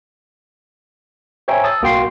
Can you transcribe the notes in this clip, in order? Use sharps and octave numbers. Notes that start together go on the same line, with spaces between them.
C5 C#5 E5 G5 G#5 A#5
A5 D#6 E6 A6
B1 A#3 F#4 G5 C6 C7